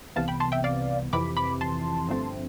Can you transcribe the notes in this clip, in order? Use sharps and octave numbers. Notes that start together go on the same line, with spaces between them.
C2 C3 E3 B3 F5 A5
G5 B5
A5 C6
E5 G5
D5 F5
F2 C3 E3 B5 D6
B5 D6
A5 C6
G1 G2 F3 A3 C4